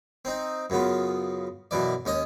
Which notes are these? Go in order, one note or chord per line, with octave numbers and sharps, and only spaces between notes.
C4 D#4
F#2 C#3 B3 F4
F#2 B2 E3 D5
D#2 C#4 D#5 D#6